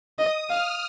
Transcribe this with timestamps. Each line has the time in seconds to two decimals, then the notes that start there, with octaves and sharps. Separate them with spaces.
0.19 D#5 D#6
0.49 F5 F6